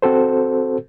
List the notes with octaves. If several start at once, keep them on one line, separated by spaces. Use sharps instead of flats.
C4 F#4 A4 C5